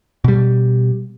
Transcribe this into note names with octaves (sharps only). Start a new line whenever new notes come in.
B2 G3